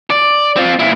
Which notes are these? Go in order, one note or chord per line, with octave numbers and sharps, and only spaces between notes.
D5
C4 F4
A#2 E4